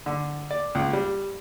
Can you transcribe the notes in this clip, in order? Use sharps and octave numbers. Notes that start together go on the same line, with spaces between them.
D3
D5
C#2
G3